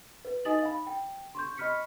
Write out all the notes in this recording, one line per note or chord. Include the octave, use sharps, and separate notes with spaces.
B4
D#4 D#5 G#5 D#6 A6 F#7
F5 B5
G5
C6 C#6 G6
D#5 B5 C#6 F6 B6 C#7